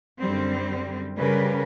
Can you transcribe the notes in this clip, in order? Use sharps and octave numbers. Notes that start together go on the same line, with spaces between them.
F#2 D3 G3 C4
C#3 G3 G4 A#4 B4